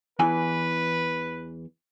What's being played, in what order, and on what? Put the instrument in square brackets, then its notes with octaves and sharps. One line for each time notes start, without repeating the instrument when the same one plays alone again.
[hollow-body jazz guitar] E2 E3 G#5 [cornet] B4